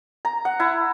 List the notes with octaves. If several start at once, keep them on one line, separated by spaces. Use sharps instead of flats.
A#5
F#5
E4